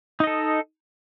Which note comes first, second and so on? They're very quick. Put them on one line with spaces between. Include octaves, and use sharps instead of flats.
D#4 D#5 A4